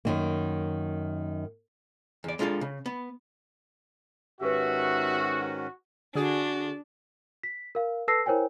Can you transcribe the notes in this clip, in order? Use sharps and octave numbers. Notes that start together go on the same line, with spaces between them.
F#2 D#3 A#3
E2 D5
G#3 D4 F4 G4 A4
C#3
B3
G#2 D#3 C#4 F#4 G4 B4 E5
D3 D4 F#4 G#4
B6
A#4 F5
A4 B4 A5 E6 A#6 C7
E4 A#4 C5 C#5 G5 G#5